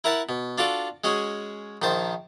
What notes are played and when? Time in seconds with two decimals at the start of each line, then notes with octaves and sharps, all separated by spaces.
0.04 E4 A#4 E5 F#5 A5
0.29 B2
0.58 D4 F4 F#4 A4 D5
1.04 G#3 C#4 F#4 G#4
1.82 A#1 D#3 C5 A5